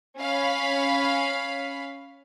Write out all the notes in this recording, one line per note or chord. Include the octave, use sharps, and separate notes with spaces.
C#4 F5 B5